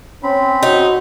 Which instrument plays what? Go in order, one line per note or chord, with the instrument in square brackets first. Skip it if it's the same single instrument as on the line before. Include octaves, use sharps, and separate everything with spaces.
[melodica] C4 B5 [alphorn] C#4
[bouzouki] D#4 [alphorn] F#4